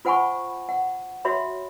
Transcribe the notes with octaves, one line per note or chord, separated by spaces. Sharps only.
F4 C5 F#5 G#5 B5 C#6
F#5
F#4 C#5 E5 B5